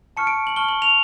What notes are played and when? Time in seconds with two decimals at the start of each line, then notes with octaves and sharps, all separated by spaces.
0.17 A5 C#6 F6 C#7
0.27 D7
0.47 F#7
0.56 A5 C#6 F6 G7
0.69 F#7
0.82 F7